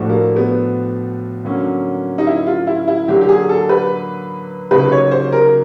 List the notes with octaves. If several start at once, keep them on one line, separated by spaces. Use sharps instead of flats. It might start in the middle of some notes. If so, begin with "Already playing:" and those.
Already playing: A2 F3 A3 D4 F#4
A#3
B3
D3 F#3 A#3 C#4 F#4
D#4
E4
F4
E4
E4
D3 F#3 A#3 D4 G4
G4
G#4
A4
B4
C#3 F#3 A#3 D#4 F#4 B4
C#5
C5
A#4